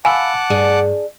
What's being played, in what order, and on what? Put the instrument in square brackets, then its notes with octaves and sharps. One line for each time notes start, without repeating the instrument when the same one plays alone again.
[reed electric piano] F5 B5 E6 [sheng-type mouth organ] F#5 A5 D6 [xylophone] G#5
[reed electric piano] G2 [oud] D4 G#4